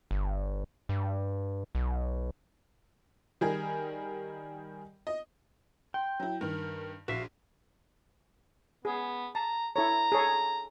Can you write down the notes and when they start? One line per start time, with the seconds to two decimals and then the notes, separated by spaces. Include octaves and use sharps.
0.11 G1
0.89 G2
1.75 B1
3.41 D#3 G3 G#4 A#4
5.07 D#5
5.94 G5 C6
6.20 F#3 E4
6.41 G2 D#3 A#4
7.08 A#1 F#4 E5 F5
8.85 B3 G#4
9.35 A5 A#5
9.76 E4 A4 C#5 A#5
10.12 G#4 A4 C#5